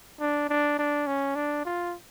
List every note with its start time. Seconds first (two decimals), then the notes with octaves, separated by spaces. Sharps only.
0.20 D4
0.50 D4
0.79 D4
1.07 C#4
1.36 D4
1.65 F4